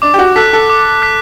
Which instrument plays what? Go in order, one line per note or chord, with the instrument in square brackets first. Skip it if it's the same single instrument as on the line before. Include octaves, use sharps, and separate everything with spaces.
[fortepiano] D4 [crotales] D6
[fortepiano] G4
F#4
[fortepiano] A4 [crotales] F#6 B6
[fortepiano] A4
[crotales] D6
F#6 B6